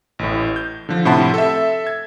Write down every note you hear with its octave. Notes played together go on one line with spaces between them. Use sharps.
A1 A2
G6
D3 F3
A2 C3 E4 F#5 A5 C6
A4 E5
G#6